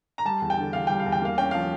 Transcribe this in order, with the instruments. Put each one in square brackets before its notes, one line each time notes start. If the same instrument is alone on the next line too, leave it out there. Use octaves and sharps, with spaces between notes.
[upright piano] A#5
G3 A5
E2
G5
D3
E2 F5
G3 G5
F5
E2
G5
A#3 F5
C#4 G5
F3 F5